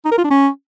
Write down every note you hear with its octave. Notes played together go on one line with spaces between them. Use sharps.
D#4
A#4
F4
D4
C#4